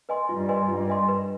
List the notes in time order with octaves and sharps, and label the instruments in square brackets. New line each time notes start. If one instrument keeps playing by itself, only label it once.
[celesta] B4 D#5 G#5 C6
[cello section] G2 [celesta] F4
[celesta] B4 D#5 G#5 C6
[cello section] G2 [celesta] F4
[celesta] B4 D#5 G#5 C6
B4